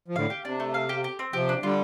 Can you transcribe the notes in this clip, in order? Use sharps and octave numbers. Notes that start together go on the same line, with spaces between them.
F3
A2 D3 F5
G4
C3 D4
A3
F5
G4
G4
C4
C3 F3 G4
D4
D3 G3 F4